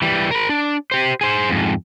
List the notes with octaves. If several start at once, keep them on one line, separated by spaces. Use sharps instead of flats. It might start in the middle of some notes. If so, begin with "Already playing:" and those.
E3 G3
A#4 B5
D4
G4 C5
G#4 C5
F2 G#2